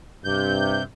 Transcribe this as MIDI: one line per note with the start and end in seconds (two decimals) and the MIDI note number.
0.24 0.82 43
0.24 0.83 48
0.24 0.83 91